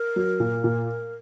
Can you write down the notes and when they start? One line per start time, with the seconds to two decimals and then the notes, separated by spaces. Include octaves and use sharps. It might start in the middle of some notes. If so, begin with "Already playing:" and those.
Already playing: A#4
0.16 F#3
0.40 A#2
0.64 A#2